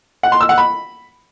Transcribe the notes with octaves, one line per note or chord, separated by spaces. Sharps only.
F#5
C6
E6
F#5
B5